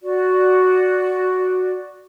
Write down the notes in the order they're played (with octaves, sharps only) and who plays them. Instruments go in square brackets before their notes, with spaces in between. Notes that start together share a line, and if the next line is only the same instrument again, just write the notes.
[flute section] F#4 D5